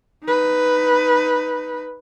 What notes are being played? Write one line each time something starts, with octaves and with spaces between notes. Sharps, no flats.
D#4 B4